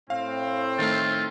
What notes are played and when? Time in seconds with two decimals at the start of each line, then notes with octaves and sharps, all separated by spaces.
0.10 A2 C4 F5
0.79 D#3 A3 F4